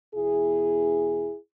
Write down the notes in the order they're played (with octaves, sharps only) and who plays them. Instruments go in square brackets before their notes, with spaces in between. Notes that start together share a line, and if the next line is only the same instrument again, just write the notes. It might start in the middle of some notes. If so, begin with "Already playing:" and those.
[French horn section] E2 B2 E4 G#4